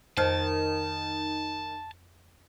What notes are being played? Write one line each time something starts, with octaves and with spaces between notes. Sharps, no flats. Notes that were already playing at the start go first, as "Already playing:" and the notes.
F2 D#3 C5 A5 F6